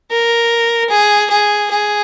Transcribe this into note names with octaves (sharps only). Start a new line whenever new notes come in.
A#4
G#4
G#4
G#4